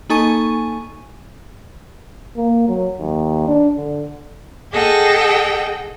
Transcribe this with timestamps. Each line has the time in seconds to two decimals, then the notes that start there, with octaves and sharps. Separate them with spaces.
0.09 A#3 D#4 A4 G#5 C#6 D#7
2.36 A#3
2.68 F#3
2.99 D#2
3.48 D4
3.77 D3
4.71 G#4 A4 D#5 F#5 G5